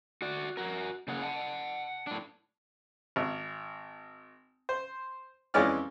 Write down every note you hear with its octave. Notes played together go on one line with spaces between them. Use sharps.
F#4 D5
F#4 A#4
C#3 A#3 G#4 F#5
F#5 A5
A2 D4
G#1
C5
F2 E3 G#3 C#4 D5 F6